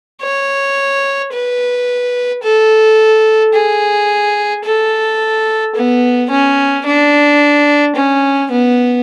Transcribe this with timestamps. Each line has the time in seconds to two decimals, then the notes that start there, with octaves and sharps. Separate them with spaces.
0.22 C#5
1.33 B4
2.43 A4
3.54 G#4
4.65 A4
5.75 B3
6.30 C#4
6.86 D4
7.96 C#4
8.51 B3